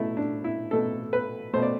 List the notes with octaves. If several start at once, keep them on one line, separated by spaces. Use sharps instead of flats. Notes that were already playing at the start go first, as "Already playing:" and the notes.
Already playing: B2 A3 E4
D4
E4
B2 A3 A4
B4
B2 A3 C5
D5